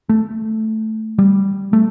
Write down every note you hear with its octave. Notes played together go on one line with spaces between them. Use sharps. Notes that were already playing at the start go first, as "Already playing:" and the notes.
A3
G3
A3